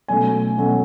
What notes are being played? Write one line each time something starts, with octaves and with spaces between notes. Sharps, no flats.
B2 F#3 A3 C#4 G#5
B2 F#3 A3 C#4